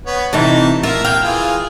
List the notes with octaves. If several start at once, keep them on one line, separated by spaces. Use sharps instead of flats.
B3 B4 C#5
C3 E3 A3 D#4 A5
F4 A#4 E5
A#3 F5 G5
E3 F4 G#4